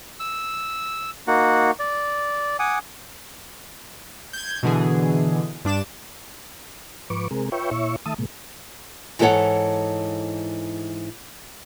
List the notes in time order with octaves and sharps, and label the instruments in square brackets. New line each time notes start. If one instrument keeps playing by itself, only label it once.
[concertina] E6
A#3 D#4 F#4 F#5
D5
F#5 G#5 D6 D#6
[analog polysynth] G6 G#6
B2 D3 E3 G#4
G2 D4 D6 E7
[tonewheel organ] G#2 F3 B4 C#6 D6
C3 G#3 C4 G#4 A#4
F4 B4 C#5 E5 G5 C#6
A#2 E4 C#5 E5 C#6
D#3 A3 E5 A5 D#6
A2 C3 G#3 A#3
[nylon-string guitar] G#2 E3 F#4 A4 C#5 F#5